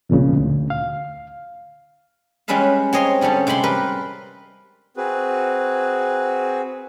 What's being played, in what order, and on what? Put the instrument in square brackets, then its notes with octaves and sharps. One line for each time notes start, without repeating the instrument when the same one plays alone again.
[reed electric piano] C2 F2 A#2 C#3
D2
F5
[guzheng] G3 G#3 C#4 B4 E5 F5
C4 C#5 D#5 A#5 C6
D3 G3 C#4 A4 C#5
C3 G#3 C4 B5 C6
G3 A#4 B4
[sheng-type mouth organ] C4 F#4 G#4 B4